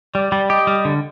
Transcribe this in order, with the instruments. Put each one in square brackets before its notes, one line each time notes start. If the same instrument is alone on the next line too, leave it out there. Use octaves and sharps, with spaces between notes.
[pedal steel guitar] G3 [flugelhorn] D5
[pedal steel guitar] G3
[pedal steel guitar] G4 [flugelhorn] D#5
[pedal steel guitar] G3
D3